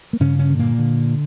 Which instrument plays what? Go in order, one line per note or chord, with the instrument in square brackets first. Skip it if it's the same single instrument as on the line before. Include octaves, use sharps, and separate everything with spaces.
[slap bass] A#3
G2 C#3 C#4
C#3 C#4
D3
A#2 A#3
D3